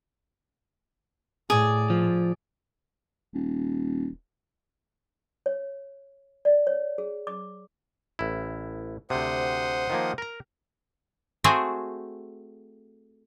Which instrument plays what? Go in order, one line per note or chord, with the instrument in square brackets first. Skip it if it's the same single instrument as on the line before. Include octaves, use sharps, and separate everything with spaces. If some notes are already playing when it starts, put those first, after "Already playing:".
[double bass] A2 [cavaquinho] G#4 D5
[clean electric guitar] F3
[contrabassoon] D#1
[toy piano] C#5
D5
C#5
G#4
D6
[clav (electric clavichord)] A1 E4
[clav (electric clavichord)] D2 C3 [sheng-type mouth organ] C5 F#5 D#6
[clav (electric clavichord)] D#3 F3 A#3
A#4 A#5
[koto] A3 C4 F#4 G#4 C5 G#5